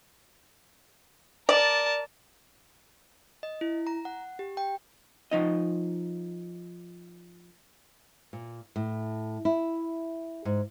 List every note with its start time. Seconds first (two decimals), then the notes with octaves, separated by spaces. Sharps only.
1.49 A#4 D5 A5
3.43 D#5
3.61 E4
3.87 A#5
4.05 F#5
4.39 G4
4.57 G5
5.31 F3 D#4 D#5
8.33 A#2
8.76 A2
9.45 E4
10.45 G#2